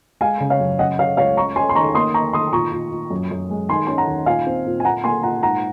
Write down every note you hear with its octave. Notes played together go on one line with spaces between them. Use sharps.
G#3 F5 G#5
C#3
C#5 F5
F#2
C#3 D#5 F#5
C#3 C#5 F5
C#2 C#5 F5
C#4 A#5 C#6
C#4 G#5 C6
C6
D#3 A#5 C#6
A#3 C6 D#6
A#3 A#5 C#6
D#3 C6 D#6
A#2 A#5 C#6
A#2
A#2
F#2
F#2
G#3
D#3 G#5 C6
C#4 C6
F#5 A#5
D#2
A#2 F5 G#5
C4
A#2
G#5
A#2 F#5 A#5
A#3 G#5 C6
A#2 F#5 A#5
G#2 F#5 A#5